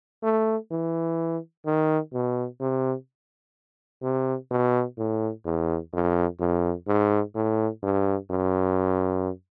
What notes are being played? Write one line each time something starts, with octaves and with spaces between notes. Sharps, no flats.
A3
E3
D#3
B2
C3
C3
B2
A2
E2
F2
F2
G#2
A2
G2
F#2